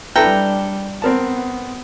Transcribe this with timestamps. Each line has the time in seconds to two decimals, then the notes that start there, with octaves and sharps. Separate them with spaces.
0.16 G3 D4 E4 A4 B4 G5 A#5
1.02 B3 C4 A#4 A5